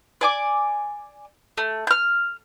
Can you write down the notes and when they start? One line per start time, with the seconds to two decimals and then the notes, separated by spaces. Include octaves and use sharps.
0.21 D5 G#5 D6
1.57 A3
1.87 F6 G6